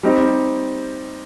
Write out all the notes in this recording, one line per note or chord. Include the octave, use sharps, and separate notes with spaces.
G3 C4 D#4 G4